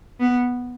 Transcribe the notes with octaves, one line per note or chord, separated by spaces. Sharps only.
B3